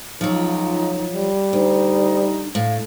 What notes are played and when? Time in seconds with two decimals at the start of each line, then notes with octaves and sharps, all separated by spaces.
0.21 C#2 F3 F#3 D#4
1.14 G3
1.53 D2 D#4
2.55 A2 F5